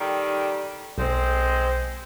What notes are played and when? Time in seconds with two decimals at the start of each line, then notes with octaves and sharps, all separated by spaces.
0.01 D#3 G3 A4
0.98 B1 G#3 C4 C5